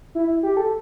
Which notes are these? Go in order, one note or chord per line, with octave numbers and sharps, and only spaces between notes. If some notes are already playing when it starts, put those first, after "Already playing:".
E4
G4
A4